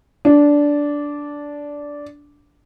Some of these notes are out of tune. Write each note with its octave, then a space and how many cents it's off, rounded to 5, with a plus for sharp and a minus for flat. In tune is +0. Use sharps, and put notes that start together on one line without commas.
D4 -10